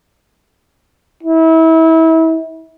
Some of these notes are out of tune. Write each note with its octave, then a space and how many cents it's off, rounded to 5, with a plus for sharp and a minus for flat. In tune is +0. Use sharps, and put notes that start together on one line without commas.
E4 -30